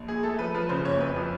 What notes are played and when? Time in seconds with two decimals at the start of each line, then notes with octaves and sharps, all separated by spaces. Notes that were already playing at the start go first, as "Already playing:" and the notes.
Already playing: A#1
0.08 A#2 G#4
0.23 A3 A4
0.39 F3 B4
0.55 F3 B4
0.69 C#3 C5
0.85 F#1 C#5
1.00 F2 B4
1.16 F3